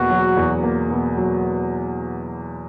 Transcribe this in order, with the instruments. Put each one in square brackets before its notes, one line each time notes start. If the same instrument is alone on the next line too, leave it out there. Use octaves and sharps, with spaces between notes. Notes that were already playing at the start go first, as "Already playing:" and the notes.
Already playing: [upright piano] E2 B2 A#3 [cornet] F#4
[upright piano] F#3
E2
A#3
B2
F#3